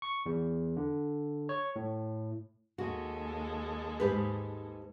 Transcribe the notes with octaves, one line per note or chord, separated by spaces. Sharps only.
C#6
E2
D3
C#5
A2
D#2 G#3 F#4 A4
G#2 G4 B4